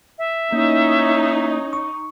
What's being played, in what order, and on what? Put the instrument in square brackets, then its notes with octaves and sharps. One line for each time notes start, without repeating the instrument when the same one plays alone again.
[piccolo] E5
[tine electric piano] A#3 [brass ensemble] C#4 E4 C#5 [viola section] D#4
[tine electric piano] C#6